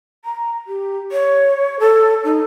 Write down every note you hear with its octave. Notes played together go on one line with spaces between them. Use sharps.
A#5
G4
C#5
A4
D#4